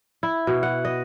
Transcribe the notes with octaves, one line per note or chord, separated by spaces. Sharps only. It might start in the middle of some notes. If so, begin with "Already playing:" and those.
E4
B2
F#5
D#5